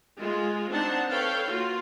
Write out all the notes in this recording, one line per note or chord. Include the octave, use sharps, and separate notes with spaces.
G#3 F4
C4 D4 D#4 C5 F#5 A5
A4 B4 C#5 F5 G5
A#3 F4 F#4